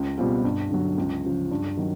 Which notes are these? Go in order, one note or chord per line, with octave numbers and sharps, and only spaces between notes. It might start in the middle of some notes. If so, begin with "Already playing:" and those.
Already playing: C#2
B2 G3 C4 F4
G2
D3 F#3
C#2
C#3 F3
G2
D#3 F#3